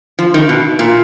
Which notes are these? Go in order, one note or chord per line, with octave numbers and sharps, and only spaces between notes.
F3
D#3
B2
A#2